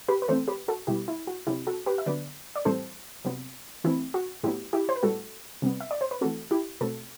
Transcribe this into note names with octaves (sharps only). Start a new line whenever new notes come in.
G4 B4
B4
E3 A3 C4 A4 C5
G4 B4
F#4 A4
B2 G3 B3 E4 G4
E4
F#4
C3 F#3 C4 E4 G4
F#4 A4
G4 B4
E5
D3 F#3 B3 B4 D5
D5
A2 E3 G3 C4 A4 C5
C3 F#3 B3
E3 A3 C4 E4
F#4
A2 F#3 B3 E4 G4
E4 G4
C5
B4
A2 G3 B3 F#4 A4
C3 G3 B3
E5
D5
C5
B4
E3 A3 C4 F#4 A4
E4 G4
B2 A3 C4 F#4 A4